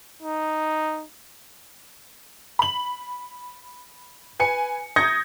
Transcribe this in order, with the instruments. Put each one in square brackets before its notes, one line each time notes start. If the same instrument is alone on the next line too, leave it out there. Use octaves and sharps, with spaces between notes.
[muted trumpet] D#4
[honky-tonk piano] B5 F#7
B4 G#5 C#7
D#6 G6 G#6 A#6 C#7